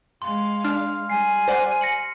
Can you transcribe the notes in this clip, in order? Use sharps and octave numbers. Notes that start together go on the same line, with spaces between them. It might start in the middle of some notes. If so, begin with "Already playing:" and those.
G#3 F5 C6
D4 F6
G3 G#5 C7
C5 D5 F#5
A#6 C#7 F#7